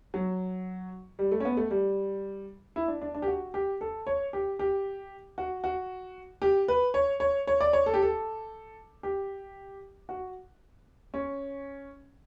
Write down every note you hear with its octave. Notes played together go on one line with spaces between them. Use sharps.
F#3
G3
A3
C#4
B3
A3
G3
E4
D4
D4
D4
G4
F#4
G4
A4
C#5
G4
G4
F#4
F#4
G4
B4
C#5
C#5
C#5
D5
C#5
A4
G4
A4
G4
F#4
C#4